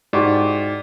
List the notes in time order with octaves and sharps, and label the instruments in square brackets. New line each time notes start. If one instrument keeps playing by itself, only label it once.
[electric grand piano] G#2 [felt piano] E4 F#4 G4 [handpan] D5